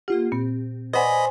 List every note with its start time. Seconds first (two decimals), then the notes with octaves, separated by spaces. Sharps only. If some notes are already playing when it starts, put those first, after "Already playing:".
0.08 A#3 F4 G4 F#5
0.32 A#2 C4
0.93 B4 C5 D5 D#5 F#5 G#5 B5